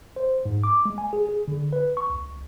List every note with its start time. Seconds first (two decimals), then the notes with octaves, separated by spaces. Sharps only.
0.16 C5
0.45 G#2
0.63 D6
0.85 G#3
0.98 G#5
1.13 G#4
1.29 G#4
1.48 D3
1.73 B4
1.97 C#6
2.10 C#2